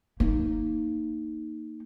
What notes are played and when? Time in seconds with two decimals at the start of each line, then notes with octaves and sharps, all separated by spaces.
0.20 A#3 D#4